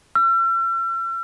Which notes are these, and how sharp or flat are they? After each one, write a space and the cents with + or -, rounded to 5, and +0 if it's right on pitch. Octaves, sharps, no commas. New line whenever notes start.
E6 +45